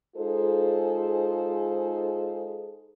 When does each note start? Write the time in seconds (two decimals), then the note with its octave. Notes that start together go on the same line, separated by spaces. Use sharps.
0.16 G#3 D#4 F4 G#4 A4 C5